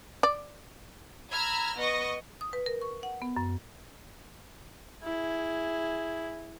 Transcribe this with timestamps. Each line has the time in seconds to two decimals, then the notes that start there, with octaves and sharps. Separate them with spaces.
0.23 D5
1.31 A#5 B5 E6 F6 G#6
1.77 B3 D#5 C#6 A#6
2.41 D#6
2.53 B4
2.66 A#4
2.82 C#6
3.03 F#5
3.22 B3
3.36 F#2
5.03 E4 G#4